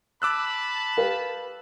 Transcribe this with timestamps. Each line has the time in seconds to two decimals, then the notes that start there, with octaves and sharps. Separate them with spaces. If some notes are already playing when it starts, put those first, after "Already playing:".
0.22 A5 B5 D6 E6 F#6
0.97 G4 B4 F5